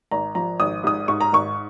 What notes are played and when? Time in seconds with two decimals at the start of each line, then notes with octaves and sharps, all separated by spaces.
0.11 G#1 A#5
0.35 F3 A#5
0.60 G#1 D#6
0.84 G#2 D#6
1.08 G#2 C#6
1.21 A#5
1.33 G#1 C#6